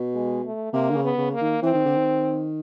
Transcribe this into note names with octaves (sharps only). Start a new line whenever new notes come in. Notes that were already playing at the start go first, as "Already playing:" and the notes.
Already playing: B2
G#3
A3
C3 A#3
D3
C#3
B3
C#3
A#3
D#3
E3 C4
D#3
D3
D#3